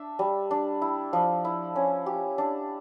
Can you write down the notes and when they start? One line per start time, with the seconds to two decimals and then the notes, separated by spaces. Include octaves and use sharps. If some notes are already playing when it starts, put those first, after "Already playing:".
Already playing: D4 E5
0.19 G3
0.51 D4
0.82 E4
1.13 F3
1.45 E4
1.75 C#4
2.06 G4
2.38 D4